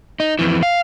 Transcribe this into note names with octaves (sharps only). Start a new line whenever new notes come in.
D#4
F2 E3
F5